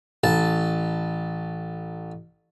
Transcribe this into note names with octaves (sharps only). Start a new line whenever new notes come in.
A1 A5